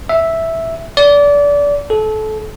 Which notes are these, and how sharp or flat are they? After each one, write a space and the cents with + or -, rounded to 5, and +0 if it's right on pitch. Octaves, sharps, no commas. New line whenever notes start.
E5 -5
D5 -25
A4 -25